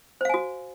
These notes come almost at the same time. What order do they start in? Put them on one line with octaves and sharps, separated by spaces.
C5 F5 G#5 F#4